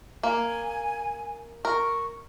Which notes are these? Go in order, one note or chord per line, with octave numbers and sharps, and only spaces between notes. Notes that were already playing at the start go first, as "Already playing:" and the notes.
A#3 G#5
A#4 C#6